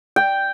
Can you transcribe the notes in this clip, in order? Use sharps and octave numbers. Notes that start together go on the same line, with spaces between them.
G5